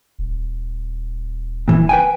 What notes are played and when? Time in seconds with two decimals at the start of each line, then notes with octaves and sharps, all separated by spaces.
0.19 D#1
1.68 A#2 E3
1.89 B4 G5 G#5